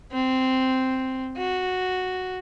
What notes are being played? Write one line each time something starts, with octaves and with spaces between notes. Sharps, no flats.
C4
F#4